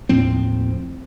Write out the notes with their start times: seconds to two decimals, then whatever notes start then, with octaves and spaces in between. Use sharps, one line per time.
0.09 D#2 A2 F3 C4